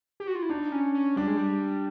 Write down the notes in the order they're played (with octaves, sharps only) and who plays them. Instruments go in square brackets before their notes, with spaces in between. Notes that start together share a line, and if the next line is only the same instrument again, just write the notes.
[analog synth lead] G4
F#4
F4
E4
[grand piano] D4 [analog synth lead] D#4
[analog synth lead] C#4
C#4
[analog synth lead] G3 [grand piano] D4
[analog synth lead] G#3
G3